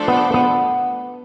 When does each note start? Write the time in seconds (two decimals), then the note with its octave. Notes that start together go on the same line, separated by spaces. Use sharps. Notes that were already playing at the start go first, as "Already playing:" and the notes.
Already playing: F3 A3 D4 A4 C5
0.08 B3
0.34 B3